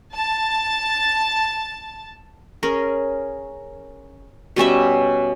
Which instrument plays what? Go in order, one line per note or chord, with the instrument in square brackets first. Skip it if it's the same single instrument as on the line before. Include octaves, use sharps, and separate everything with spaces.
[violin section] A5 A6
[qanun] C#4 G#4 A#4
B2 G3 C#4 E5